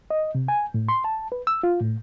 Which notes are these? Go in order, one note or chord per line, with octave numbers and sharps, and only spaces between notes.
D#5
C3
G#5
A2
C6
A5
B4
E6
F4
A2